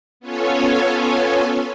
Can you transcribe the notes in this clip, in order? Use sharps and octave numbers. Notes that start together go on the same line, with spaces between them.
B3 C#4 F4 A4 C#5 G#5